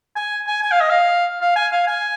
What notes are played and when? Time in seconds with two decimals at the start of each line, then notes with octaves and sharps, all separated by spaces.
0.16 G#5
0.47 G#5
0.62 G#5
0.72 F5
0.81 D#5
0.90 F5
1.41 F5
1.56 G#5
1.72 F5
1.87 G#5